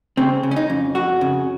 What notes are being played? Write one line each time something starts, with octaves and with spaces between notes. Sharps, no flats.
C#3 C4
C#3
C#4
D#4
F2
F2 F#4
C#3